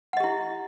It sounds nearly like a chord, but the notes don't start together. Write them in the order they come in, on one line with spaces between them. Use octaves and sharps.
F#5 D#5 G4 E4